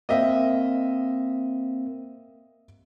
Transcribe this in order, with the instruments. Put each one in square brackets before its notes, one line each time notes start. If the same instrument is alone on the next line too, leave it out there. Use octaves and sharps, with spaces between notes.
[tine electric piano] A#3 C4 [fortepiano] D#5 E5